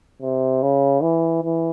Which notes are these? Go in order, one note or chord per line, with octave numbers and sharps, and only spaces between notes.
C3
C#3
E3
E3